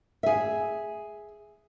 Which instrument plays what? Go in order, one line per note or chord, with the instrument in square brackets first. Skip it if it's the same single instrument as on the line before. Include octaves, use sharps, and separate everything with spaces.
[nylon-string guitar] G#4 E5